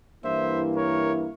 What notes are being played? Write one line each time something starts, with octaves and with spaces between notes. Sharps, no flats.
G2 E3 A#3 E4 C5 E5
A#4 C#5